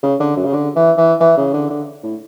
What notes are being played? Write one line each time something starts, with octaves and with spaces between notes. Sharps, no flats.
C#3
D3
F#2
C#3
D3
E3
E3
E3
C#3
D3
D3
A2